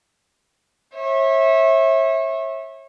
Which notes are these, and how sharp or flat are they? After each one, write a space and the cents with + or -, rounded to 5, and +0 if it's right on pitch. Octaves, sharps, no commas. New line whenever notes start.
C#5 -35 E5 -15